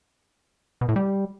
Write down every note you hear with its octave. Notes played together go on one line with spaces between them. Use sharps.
B2
A2
G3